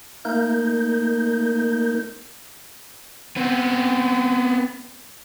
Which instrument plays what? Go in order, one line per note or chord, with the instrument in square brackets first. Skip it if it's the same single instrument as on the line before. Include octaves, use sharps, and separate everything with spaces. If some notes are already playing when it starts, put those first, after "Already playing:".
[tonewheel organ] A3 A#3 D#4 A#4 G6
[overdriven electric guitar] B3 C4